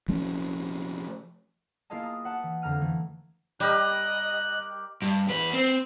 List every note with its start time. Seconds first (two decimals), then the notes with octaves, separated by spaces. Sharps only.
0.08 F3 A3 C#4
1.90 A#3 E4 F4 G#4 D#5 A5
2.03 A#5 D#6
2.24 B4 F#5 A5
2.43 E3
2.62 F2 D3 A#5 F6 D#7
2.81 E3 A3
3.60 G3 G4 A#4 D#5 F#6
5.02 G2
5.28 E2 B4
5.53 C4